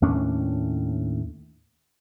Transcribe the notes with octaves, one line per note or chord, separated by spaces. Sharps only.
D#2 A2 C#4 D4